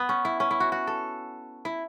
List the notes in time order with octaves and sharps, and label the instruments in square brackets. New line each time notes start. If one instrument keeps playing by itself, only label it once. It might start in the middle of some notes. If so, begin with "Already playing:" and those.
Already playing: [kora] B3
C#4
E4
C#4
E4
F#4
F#4
A4
E4